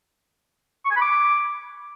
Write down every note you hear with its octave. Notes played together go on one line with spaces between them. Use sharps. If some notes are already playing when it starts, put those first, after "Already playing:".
C#6
G#5
B5
D6